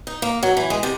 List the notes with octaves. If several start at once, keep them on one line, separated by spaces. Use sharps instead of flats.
D#4
A#3
F#3
E3
G#3
C3